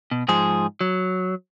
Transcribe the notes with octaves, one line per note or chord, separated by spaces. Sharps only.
B2
G#2 F3 G#4 C5
F#3